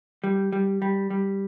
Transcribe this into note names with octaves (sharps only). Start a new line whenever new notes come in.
G3
G3
G3
G3